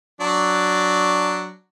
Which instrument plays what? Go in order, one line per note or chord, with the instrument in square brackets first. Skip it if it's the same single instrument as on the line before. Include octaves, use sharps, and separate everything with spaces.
[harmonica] F#3 D4